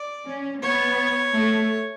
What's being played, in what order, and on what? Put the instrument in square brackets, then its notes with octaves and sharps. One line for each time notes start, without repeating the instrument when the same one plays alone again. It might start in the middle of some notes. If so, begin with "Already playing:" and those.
Already playing: [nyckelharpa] D5
[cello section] C#4
[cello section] B3 [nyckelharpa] C#5
[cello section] A3